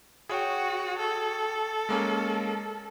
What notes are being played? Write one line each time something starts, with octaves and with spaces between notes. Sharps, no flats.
F#4 G#4 C#5 G5
A4
G#3 A#3 C#4